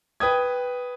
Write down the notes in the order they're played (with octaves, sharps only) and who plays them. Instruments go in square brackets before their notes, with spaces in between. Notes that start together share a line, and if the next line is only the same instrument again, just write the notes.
[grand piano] B4 G5 D#6 G#6